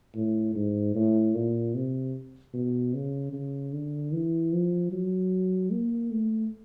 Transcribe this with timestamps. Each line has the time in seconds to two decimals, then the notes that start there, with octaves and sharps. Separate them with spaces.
0.16 A2
0.56 G#2
0.95 A2
1.35 A#2
1.75 C3
2.54 B2
2.94 C#3
3.33 C#3
3.73 D3
4.12 E3
4.53 F3
4.92 F#3
5.72 A#3
6.11 A3